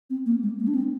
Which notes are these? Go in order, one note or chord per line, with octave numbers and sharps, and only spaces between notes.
C4
A#3
G#3
A#3
D4
C4